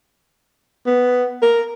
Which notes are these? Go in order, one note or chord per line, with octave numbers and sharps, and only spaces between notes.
B3
A#4